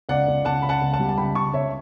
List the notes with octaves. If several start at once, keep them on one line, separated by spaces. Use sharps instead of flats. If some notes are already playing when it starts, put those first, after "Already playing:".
C#2 D5 F#5
C#2
C#2 F#5 A5
C#3 B5
F#5 A5
C#2
F#5 A5
G3
A5
C#2 G5 B5
C#2 A5 C#6
C#2 C#5 E5